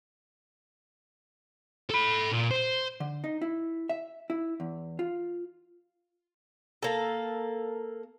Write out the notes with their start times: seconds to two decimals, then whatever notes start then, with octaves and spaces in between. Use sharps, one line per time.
1.90 A4 B5
2.31 A#2
2.51 C5
3.00 D3
3.24 D#4
3.42 E4
3.89 E5
4.30 E4
4.60 E2
4.99 F4
6.82 A#3 A4